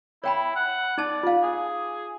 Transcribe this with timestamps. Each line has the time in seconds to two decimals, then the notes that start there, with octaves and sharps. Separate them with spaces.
0.24 E4 C#5 G5 B5
0.56 F#5
0.98 D#4 D5 A5
1.23 F4 F5
1.43 G#4